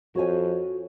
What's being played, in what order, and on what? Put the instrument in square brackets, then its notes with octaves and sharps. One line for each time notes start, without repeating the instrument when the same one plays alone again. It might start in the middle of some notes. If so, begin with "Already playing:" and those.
[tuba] F2 [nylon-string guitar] F#4 C#5 G#5